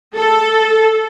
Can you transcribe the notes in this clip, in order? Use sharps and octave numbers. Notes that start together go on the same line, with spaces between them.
A4